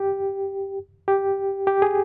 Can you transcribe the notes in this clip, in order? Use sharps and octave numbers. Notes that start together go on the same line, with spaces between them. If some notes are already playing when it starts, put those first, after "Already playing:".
Already playing: G4
G4
G4
G#4